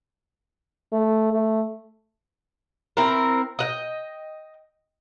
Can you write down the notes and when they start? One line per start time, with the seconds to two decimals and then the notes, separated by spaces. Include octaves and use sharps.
0.92 A3
1.32 A3
2.97 C4 E4 A#4
3.59 D#5 F#5 G5